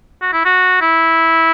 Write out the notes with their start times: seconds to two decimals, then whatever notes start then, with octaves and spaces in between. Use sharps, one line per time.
0.22 F#4
0.33 E4
0.45 F#4
0.82 E4